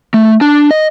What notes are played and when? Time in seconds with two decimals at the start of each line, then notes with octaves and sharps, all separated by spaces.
0.14 A3
0.41 D4
0.71 D#5